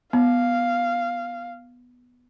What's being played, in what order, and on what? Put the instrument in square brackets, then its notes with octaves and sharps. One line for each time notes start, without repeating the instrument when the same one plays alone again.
[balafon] B3 [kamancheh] F5